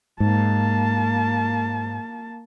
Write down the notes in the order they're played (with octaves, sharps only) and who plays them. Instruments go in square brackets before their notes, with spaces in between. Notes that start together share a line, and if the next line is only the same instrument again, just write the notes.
[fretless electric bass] G#2 [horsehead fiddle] A#3 A5